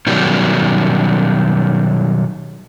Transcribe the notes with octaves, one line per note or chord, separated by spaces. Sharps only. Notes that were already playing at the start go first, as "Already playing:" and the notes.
B2 D#3 F#3 G3